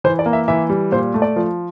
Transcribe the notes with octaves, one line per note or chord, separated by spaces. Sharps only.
E3 C5
D5
A#3
E5
E3 E5
G3
A#2 C5
A3
D5
F3